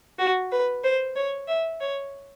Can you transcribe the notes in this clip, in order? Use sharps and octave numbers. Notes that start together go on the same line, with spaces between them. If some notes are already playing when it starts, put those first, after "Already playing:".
F#4
B4
C5
C#5
E5
C#5